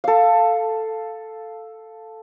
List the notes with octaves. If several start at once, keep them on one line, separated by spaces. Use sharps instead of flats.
A4 F5